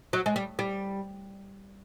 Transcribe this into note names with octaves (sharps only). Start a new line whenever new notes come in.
F#3
G#3
G3
G3